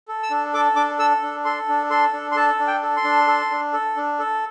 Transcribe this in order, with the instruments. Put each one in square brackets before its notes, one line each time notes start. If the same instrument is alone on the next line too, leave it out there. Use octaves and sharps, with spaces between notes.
[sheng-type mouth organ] A4
E6
D4
A4 D6
D4 D6
A4 E6
D4
A4 C6
D4
A4 C6
D4
C6
A4 A5
D4
G5
A4
C6
D4
A4
D4
A4
D4
A4